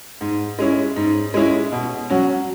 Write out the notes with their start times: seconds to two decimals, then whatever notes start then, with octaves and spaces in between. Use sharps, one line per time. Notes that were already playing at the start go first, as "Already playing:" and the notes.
0.21 G#2
0.59 G#3 C#4 E4
0.96 G#2
1.34 G#3 C#4 E4
1.72 B2
2.10 F#3 C#4 F#4